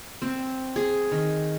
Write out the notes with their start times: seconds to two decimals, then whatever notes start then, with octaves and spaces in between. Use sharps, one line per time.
0.22 C4
0.76 G#4
1.12 D#3